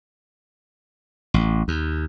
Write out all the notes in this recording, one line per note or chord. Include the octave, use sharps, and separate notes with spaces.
A1
D#2